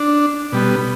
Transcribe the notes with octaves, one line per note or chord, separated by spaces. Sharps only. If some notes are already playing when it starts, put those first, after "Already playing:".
Already playing: D4
B2 G3 B3